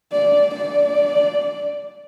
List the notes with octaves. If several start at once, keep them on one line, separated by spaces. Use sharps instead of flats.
D5
D5